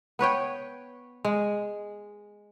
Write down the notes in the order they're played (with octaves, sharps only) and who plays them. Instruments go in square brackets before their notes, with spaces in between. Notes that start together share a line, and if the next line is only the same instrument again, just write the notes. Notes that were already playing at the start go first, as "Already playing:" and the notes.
[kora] B3 B4 C#5 G5
G#3